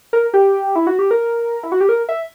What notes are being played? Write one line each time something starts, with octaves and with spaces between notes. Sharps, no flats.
A#4
G4
E4
F#4
G4
A#4
E4
F#4
G4
A#4
E5